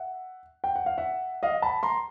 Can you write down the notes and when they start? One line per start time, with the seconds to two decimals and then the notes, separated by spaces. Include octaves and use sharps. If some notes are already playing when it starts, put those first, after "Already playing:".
Already playing: E5 F#5
0.64 G5
0.76 F#5
0.86 F5
0.98 E5 F#5
1.43 D#5 F5
1.62 A5 B5
1.83 A#5 C6